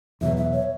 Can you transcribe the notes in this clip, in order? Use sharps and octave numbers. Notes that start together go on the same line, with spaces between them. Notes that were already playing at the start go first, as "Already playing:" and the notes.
E2 B2 F#3 E5
E5
C#5